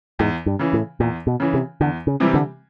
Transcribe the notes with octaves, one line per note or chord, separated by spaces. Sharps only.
E2 G#2
G2
C#3 E3
A2
E2 A#2
B2
C#3 E3
C3
E2 D3
C#3
C3 E3 G3
D3